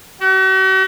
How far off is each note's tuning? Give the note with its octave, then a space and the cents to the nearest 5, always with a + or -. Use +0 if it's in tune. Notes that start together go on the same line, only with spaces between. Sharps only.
F#4 +45